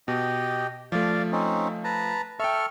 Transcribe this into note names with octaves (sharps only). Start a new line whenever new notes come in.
B2 G4 D#5
F3 A3 D5 F5
C4 C#4 D#4
B4 A5 A#5
A4 E5 G5 C#6 F6